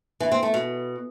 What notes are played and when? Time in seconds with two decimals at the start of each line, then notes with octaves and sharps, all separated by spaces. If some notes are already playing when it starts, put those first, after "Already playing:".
0.20 E3
0.32 C4
0.43 A3
0.54 B2